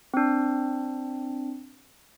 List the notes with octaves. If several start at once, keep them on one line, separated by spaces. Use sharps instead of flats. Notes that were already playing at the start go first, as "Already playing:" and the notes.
C4 D4